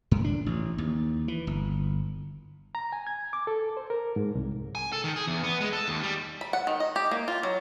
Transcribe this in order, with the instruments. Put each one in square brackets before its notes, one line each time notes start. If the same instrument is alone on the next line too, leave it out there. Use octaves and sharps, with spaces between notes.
[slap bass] G2
D4
A1
D#2
E3
G1
[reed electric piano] A#5
G#5
G#6
D6
A4
C5
A#4
G#2
C2
[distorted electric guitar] G#5
A4
D#3
G#4
E2
B3
G#3
A4
D#2
G3
[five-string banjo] B5
F#5
D#3
D#5
G4
A#3
F4
F#3